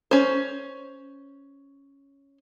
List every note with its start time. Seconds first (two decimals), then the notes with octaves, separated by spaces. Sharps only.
0.11 C#4 C5